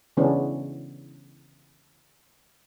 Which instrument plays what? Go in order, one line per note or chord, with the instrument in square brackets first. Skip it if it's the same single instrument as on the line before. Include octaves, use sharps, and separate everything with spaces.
[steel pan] C#3 E3 G#3 B3 C#4 D4